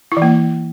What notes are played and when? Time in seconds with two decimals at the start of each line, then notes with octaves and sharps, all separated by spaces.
0.12 E4
0.17 E3
0.22 A#3